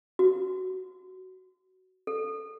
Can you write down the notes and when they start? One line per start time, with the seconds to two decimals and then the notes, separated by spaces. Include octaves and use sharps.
0.19 F#4
2.07 A4